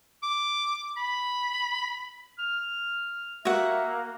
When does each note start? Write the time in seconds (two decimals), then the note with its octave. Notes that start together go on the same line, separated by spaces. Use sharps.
0.23 D6
0.97 B5
2.39 F6
3.45 A#3 F#4 E5 F#5